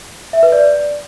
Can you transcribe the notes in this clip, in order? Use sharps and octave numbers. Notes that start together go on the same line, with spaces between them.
E5
B4
D5